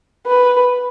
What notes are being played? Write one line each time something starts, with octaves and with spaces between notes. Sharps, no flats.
B4